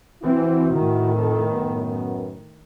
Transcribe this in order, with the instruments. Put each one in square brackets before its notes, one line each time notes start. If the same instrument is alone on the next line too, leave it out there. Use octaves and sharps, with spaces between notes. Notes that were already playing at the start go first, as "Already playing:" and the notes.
[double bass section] E3 C4 [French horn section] E4 F#4
[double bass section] A2 D#3
[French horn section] F2 A4
F#2 B3